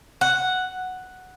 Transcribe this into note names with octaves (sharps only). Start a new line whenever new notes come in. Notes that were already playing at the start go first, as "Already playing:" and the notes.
F#5